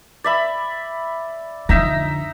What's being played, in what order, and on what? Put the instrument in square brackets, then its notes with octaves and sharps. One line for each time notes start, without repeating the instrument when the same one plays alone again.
[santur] D5 E5 B5
[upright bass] F2 D3 [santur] D#4 E5 A#5